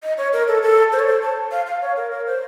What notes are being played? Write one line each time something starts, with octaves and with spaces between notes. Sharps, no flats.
D#5
C#5
A#4
A4
A4
C5
C#5
C5
A5
F5
F5
C#5
A#4
A#4
C5